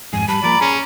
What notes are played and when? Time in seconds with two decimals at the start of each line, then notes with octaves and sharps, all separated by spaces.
0.13 F2 G#2 G#5
0.28 G3 A5 B5
0.43 F3 A#3 D5 A#5
0.61 C#4 G#4